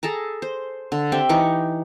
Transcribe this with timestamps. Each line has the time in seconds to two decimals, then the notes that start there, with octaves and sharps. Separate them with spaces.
0.03 G#4 A4 A5 A#5
0.42 C5
0.92 D3
1.12 C4 G4 E5 G5
1.29 E3 D#4 C#6 D6